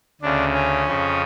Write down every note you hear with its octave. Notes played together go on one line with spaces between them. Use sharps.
D2 C#3 D4
C#4
F2 C#3